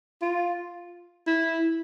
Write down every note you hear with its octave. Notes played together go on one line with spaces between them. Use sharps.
F4
E4